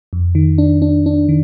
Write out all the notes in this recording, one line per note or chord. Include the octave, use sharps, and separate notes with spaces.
F2
D#3
D4
D4
D4
D#3